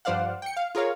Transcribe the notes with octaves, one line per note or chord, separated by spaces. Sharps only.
G2 F3 C5 D5 F5 F#5
G5 C#7
F5
F4 G#4 A#4 C#5 F5